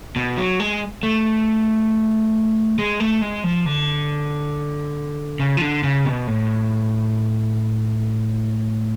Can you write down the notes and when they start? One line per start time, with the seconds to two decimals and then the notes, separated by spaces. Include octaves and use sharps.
0.16 B2
0.38 F#3
0.60 G#3
1.03 A3
2.79 G#3
3.00 A3
3.21 G#3
3.44 F3
3.66 D3
5.40 C#3
5.57 F3
5.62 D3
5.84 C#3
6.05 B2
6.27 A2